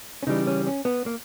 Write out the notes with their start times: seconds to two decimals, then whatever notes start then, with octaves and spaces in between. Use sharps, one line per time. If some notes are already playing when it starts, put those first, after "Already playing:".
0.23 C#4
0.27 C#3 E3 G3 D#4
0.47 C#4
0.67 C#4
0.85 B3
1.06 A#3